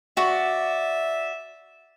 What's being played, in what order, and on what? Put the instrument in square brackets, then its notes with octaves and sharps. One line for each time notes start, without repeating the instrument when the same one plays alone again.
[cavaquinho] F#4 D5 [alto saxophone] E5